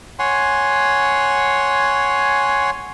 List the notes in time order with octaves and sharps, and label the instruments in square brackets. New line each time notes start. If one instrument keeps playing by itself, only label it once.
[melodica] C#5 F#5 G#5 C6